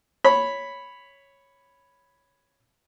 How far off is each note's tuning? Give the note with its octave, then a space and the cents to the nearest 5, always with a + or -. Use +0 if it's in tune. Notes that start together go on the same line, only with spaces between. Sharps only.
C#5 +0 B5 +0